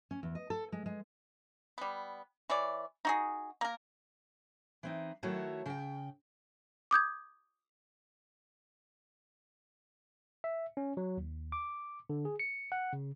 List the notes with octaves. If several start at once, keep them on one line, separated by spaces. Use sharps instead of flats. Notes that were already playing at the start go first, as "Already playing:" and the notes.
C#4
E2
D#5
A4
G#3
G#3
G3 B3
E3 C#5 D5
D#4 F#4 G#4
A#3 A#4
E3 C4 D#4
D#3 F#3 A3 E4 F#4 C#5
C#3 G5
D6 D#6 G6 G#6
E5
C#4
F#3
D#2
D6
D3
G#4
C#7
F#5
C#3